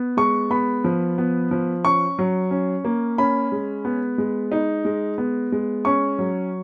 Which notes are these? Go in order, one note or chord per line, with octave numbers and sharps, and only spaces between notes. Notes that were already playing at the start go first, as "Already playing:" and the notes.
Already playing: B3
G#3 C#6
B3 B5
F3
B3
F3
C#4 C#6
F#3
C#4
A#3
C#4 B5
G#3
B3
G#3
D#4
G#3
B3
G#3
C#4 C#6
F#3